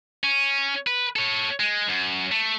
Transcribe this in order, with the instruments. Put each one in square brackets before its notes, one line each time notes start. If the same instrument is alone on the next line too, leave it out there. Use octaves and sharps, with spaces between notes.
[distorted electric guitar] C#4
B4
A4 C#5
G#3
F#2
A3